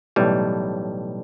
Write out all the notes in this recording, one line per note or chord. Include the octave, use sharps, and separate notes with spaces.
B1 A2 E3 G3